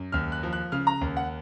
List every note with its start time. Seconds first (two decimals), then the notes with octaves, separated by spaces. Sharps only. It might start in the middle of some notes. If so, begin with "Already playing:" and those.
Already playing: F#2
0.12 D#2 F6
0.32 F#6
0.43 F3
0.53 F#6
0.72 C#3 F6
0.87 A#5
1.01 D#2
1.17 F#5